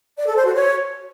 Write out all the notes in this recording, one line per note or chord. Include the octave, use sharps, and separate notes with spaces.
D5
A4
C5
F#4
C#5